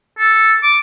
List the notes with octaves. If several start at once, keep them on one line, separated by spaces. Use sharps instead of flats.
A4
D6